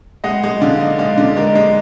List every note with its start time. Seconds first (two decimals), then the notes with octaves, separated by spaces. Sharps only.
0.24 G#3 D#5 F#5
0.43 G#3
0.61 D3 D5 F5
0.80 D#4
0.98 G#3 D5 F5
1.18 D3
1.36 G#3 A#4 D5
1.55 G#3